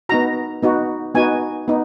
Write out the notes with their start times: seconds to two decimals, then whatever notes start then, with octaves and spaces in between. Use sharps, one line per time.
0.09 B3 D#4 F#4 A#5
0.62 B3 D#4 F#4
1.15 B3 D#4 F#4 G#5
1.68 B3 D#4